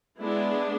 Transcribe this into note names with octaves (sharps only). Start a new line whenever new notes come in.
G#3 B3 D4 E4